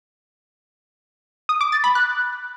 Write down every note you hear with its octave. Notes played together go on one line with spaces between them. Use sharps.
D#6
D6
A6
B5
F#6